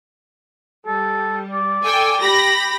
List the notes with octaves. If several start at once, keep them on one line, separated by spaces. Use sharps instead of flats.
G3 A4
D5
A4 G5 G#5
G4 B5 A#6